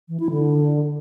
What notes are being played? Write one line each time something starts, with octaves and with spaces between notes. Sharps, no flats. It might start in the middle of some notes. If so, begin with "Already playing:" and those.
E3
E4
D3